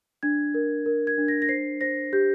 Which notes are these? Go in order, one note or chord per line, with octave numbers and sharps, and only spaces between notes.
D4 G#6
A#4
A#4
G#6
D4
A#6
A#6
C5 C7
C5 A#6
G4 G6